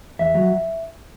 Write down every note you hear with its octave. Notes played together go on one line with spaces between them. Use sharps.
E2 E5
F#3